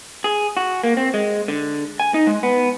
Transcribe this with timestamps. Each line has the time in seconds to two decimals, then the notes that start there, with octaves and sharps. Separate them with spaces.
0.24 G#4
0.57 F#4
0.83 A#3
0.97 C4
1.14 G#3
1.48 D3
2.00 G#5
2.14 D#4
2.27 G#3
2.43 B3